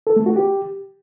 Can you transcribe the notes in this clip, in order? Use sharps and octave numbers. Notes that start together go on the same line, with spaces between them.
A4
A3
F#4
G4